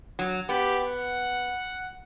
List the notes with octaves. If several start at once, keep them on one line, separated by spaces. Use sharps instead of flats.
F#3
B3 G4
F#5